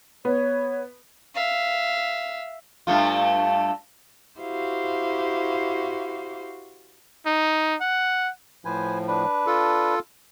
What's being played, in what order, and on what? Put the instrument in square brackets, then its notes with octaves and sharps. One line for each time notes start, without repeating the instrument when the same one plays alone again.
[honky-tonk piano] B3 [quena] C#5
[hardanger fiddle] E5 F5
[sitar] G2 A3 F4
[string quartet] E4 F#4 G4 C5 F5
[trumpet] D#4
F#5
[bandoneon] A2 F3 [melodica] B4 C5 G#5
[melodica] D4 B4
[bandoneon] F4 A4